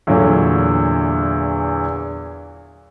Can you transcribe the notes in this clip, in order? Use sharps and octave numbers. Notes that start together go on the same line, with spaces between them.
E2 A#2 D3 F#3